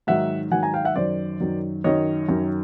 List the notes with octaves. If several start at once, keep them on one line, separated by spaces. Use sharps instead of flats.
G#2 D#3 F#3 E5 F#5
G#2 D#3 F#3 F#5 G#5
G#5 A#5
F5 G5
E5 F#5
F#2 D#3 F#3 C5 D5
F#2 D#3 F#3
F#2 D#3 F#3 C#5 D#5
F#2 D#3 F#3